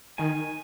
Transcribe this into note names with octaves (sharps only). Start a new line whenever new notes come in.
D#3 G#5